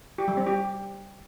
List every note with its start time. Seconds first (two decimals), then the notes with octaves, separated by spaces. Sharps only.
0.18 G4
0.28 G3
0.37 C4
0.47 G4